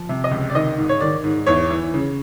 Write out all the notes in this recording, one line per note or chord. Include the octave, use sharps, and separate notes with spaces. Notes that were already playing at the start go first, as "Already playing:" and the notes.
Already playing: F3
C3
D#5
C#2
D5
D#3 D#5
G#2
C#5
D#3 D5
G#2
E2 C#5
E3
C#3